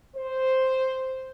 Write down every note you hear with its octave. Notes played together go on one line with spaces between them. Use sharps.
C5